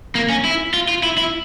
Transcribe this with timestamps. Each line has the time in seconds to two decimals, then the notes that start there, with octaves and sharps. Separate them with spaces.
0.15 A#3
0.30 C#4
0.45 E4
0.74 F4
0.88 F4
1.03 E4
1.18 E4